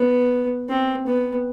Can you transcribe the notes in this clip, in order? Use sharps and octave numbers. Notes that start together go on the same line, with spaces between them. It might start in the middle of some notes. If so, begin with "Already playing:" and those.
Already playing: B3
C4
B3